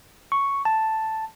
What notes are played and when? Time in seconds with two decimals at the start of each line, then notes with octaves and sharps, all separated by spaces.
0.32 C#6
0.65 A5